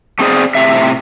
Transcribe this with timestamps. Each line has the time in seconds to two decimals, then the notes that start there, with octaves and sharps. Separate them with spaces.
0.19 A3 C4 G#4 C5 D5
0.55 A2 C3 E5